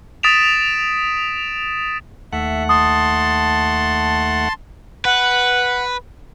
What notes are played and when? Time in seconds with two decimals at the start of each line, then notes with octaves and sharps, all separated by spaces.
0.23 D#6 A6 B6 D7 E7 F7
2.33 D#2 A3 E5 F#5
2.69 A5 C6 D#6
5.05 B4 F#5